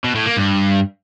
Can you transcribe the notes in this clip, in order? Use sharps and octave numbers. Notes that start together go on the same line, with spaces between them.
B2
A2
A#3
G2